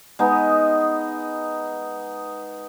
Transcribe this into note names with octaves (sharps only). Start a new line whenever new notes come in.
G#3 B3 D#4